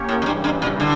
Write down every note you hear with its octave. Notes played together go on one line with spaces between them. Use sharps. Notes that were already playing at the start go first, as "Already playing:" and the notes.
Already playing: A#3 C#4 G4 C#5
A2
F2
G2 C#3 E3 G3
G2
A#2
D3